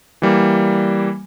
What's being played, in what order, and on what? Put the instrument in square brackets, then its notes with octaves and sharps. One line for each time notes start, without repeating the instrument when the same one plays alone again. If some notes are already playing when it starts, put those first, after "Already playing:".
[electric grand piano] E3 G3 A#3